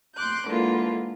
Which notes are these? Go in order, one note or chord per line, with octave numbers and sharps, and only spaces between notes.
C6 D6 F#6 G6
D3 E3 G#3 A#3 F4